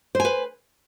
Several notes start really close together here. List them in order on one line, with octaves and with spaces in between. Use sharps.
C5 G#5 B4